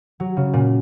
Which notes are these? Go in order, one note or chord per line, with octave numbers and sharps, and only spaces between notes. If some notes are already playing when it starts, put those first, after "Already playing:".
F#3
C#3
A#2